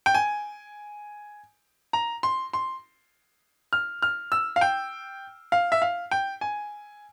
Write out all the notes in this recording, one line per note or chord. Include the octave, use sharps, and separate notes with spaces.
G5
G#5
A#5
C6
C6
F6
F6
E6
F5
G5
F5
E5
F5
G5
G#5